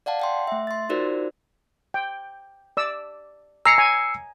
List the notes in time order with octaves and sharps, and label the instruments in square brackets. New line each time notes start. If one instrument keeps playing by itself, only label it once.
[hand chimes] D5 F5 F#5 A5
F#5 G5 C6
A3 E5
C6 A6
D#4 F4 F#4 A#4 C5 D5
[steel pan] G5
D5 E6
[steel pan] G#5 A#5 [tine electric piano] E6 C7 C#7
[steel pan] G#5